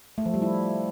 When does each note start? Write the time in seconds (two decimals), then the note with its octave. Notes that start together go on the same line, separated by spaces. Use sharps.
0.18 A3
0.26 F3
0.34 G3
0.42 E4